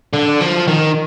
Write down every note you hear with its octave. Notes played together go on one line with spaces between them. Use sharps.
D3
F3
D#3